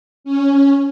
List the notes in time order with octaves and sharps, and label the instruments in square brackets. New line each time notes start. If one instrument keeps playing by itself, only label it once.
[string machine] C#4